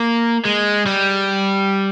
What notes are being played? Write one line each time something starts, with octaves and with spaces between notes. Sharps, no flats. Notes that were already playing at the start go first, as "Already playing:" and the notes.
Already playing: A#3
G#3
G3